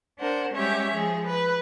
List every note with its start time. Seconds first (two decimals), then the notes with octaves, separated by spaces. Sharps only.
0.18 D4 A#4 C5 F#5
0.53 G3 G#3 C#4 G4 C#5 E5
0.93 F3 G#4
1.27 B4